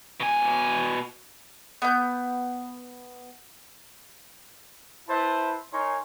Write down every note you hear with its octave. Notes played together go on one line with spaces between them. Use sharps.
B2 G#5
B3 G6
E4 B4 C5 E5 A5
D#4 A#4 C#5 G#5 C6 C#6